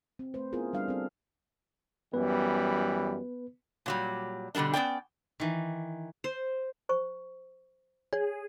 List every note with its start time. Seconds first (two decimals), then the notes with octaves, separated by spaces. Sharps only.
0.19 C4
0.34 A3 C4 B4 C5
0.53 B3 C#4 E4 F4 G#4 A#4
0.73 G3 D4 F5
0.88 C4 A4
2.13 F#2 E3 G3 B3 B4
3.86 A#2 F#3 G3
4.55 B2 D3 G3 A#3 D4
4.73 B3 C#4 D5 G5
5.40 D#3 E3
6.24 C5
6.89 C5 C#6
8.13 G#4 C#5